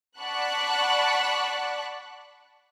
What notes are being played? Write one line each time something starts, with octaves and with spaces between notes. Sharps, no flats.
D5 F#5 A5 B5 C#6 F#6